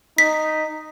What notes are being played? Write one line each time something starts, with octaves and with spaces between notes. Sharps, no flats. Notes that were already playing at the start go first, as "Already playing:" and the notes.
D#4 B6